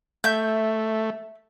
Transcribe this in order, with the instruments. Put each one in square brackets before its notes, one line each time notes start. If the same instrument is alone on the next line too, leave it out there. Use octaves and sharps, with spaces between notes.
[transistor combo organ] A3 [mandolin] E5 G6